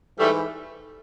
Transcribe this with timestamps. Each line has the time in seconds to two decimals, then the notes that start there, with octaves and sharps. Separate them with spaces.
0.18 G#2 E3 G3 A3